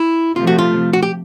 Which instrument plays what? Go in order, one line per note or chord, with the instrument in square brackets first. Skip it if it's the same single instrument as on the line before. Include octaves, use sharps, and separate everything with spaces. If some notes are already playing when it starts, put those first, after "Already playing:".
Already playing: [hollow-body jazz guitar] E4
[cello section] C3 F3 A3 [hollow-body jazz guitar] F4
[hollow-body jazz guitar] F#4
F4
F#4
G4